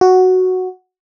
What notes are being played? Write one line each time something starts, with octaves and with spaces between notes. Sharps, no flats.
F#4